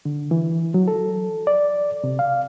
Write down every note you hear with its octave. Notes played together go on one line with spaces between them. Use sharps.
D3
E3
F#3
A4
D5
C3
F5